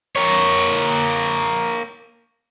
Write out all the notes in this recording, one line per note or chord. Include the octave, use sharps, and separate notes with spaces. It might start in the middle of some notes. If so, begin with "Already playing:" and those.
A#3 C#5